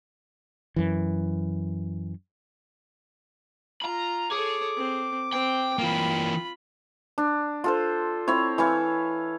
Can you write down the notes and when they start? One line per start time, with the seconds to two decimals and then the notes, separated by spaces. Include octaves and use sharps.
0.76 F#2 E3
3.82 F4 A#5 B5
4.32 G#4 A4 C#5 D6
4.77 C4
5.33 C4 G5
5.79 E3 A#3 F4 B5
7.18 D4
7.64 F4 A4 C5
8.28 C4 E4 C#5
8.58 E3 E4 C#5 F5